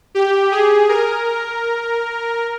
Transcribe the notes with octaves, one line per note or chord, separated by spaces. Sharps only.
G4
G#4
A#4